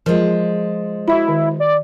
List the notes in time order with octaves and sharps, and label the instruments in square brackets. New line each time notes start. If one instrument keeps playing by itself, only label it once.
[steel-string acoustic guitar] F3 G#3 [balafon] A#4
[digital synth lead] E4 [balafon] F#4 E5 B5
[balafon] D#3
[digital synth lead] D5